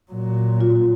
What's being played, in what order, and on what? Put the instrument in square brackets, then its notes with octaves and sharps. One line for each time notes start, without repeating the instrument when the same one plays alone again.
[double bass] A#2 F#3
[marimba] F4